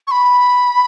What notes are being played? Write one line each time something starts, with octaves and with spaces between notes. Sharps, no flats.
C#6
B5